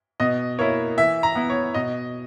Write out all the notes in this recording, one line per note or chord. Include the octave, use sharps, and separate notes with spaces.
B2 D#5
A#3 E4 C#5
E3 E5
A#5
B3 E4
C#5
B2 D#5